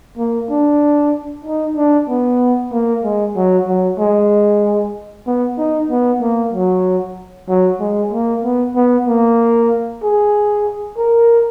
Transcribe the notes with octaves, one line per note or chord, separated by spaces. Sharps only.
A#3
D4
D#4
D4
B3
A#3
G#3
F#3
F#3
G#3
B3
D#4
B3
A#3
F#3
F#3
G#3
A#3
B3
B3
A#3
G#4
A#4